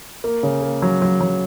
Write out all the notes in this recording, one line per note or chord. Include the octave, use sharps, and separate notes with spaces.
A#3
C#3
A#3
F#3
F#3
F#3